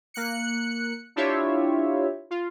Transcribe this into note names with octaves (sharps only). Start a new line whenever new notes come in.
A#3 F#6 C#7
D4 E4 F4 G4 C#5 E5
F4